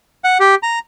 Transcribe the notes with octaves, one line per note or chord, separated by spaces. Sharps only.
F#5
G4
A#5